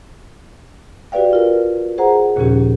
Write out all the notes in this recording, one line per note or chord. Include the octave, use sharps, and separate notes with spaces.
F#4 G4 B4 D5 F5 G5
F4 A#4
G#4 C5 F#5 A#5
D#2 A#2 C#3 F3 C#4 G4